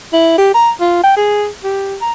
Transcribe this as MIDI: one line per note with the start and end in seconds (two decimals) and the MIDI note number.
0.13 0.37 64
0.38 0.53 67
0.54 0.71 82
0.81 1.02 65
1.03 1.13 79
1.17 1.48 68
1.64 1.96 67
2.01 2.13 82